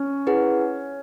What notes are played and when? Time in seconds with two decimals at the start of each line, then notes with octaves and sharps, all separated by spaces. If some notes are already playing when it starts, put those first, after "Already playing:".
Already playing: C#4
0.27 E4 G#4 B4 F#5